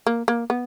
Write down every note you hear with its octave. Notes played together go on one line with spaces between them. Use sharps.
A#3
A#3
B3